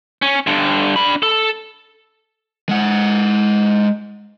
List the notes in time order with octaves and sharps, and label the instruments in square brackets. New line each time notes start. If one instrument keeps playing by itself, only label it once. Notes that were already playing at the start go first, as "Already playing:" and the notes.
[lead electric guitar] C#4
G2 D3
D4 B5
A4
G#3 F#5